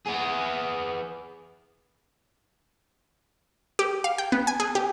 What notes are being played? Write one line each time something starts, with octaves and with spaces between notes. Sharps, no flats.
B3 G#4
G4
F5
G5
B3
G#5
G#4
G4